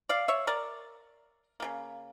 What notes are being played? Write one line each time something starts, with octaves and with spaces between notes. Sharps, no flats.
D5 F5
C#5 E5
A#4 D5
C#3 G3 A#3